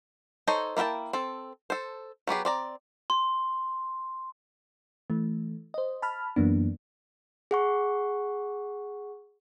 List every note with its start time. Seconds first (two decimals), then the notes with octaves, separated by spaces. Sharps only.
0.47 D#4 A4 C5 C#5 D#5
0.77 A#3 E4 A4 G5 A5
1.13 C4 A4
1.70 A4 C5
2.27 F#3 B3 G4 G#4
2.45 C4 D5 A#5
3.10 C6
5.10 E3 A3
5.74 C5 D#5
6.02 A5 B5 F6
6.36 F#2 E3 F#3 A#3 B3 D4
7.51 G#4 F#5 C#6